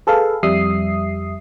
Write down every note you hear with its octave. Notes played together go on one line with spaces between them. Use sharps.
G#4 A4 B4 F5
F2 G3 E5 D#6 C7